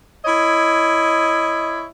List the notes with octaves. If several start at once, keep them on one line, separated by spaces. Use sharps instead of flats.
E4 C#5 D#5